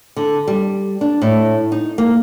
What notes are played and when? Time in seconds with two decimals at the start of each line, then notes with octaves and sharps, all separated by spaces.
0.16 D3
0.48 G3
1.01 D4
1.21 A2
1.72 D#4
1.98 A#3